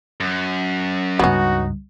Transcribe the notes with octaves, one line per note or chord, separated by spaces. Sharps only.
F#2
C#2 G2 B3 C#4 D#4 F#4